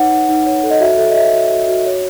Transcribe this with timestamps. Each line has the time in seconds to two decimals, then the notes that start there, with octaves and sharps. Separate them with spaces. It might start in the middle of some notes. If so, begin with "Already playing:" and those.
Already playing: D#4 B4 C#5 F#5
0.11 D#4
0.29 D#4
0.46 C#5
0.63 A4
0.70 D#5
0.80 F#4 E5
0.98 A4 E5
1.10 D#5
1.16 C#5 E5
1.34 F#4
1.51 F#4
1.68 F#4
1.86 C#5